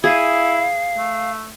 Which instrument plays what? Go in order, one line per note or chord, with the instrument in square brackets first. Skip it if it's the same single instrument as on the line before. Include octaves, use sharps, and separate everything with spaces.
[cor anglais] E4 [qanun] G#4 [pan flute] F5
[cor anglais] A3